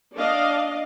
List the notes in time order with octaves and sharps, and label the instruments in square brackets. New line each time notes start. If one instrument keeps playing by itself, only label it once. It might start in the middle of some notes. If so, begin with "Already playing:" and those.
[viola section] D4 D5 D#5 F5